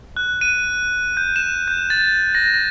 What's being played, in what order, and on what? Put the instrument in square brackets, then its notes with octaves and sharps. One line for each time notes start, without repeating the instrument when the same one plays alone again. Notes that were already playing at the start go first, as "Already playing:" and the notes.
[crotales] F#6
D#7
G6
E7
G6
A6
A#6
A#6